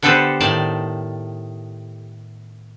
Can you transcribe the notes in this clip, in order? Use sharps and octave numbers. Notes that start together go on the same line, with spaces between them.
D3 B3 G4 A4 B4 C5
A2 D#3 D5 A5